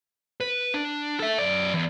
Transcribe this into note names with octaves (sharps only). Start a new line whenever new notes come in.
B4
D4
A4 E5
F#2 D5
E2